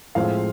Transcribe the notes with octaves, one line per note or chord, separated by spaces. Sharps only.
A2 F3 G#3 C4 F5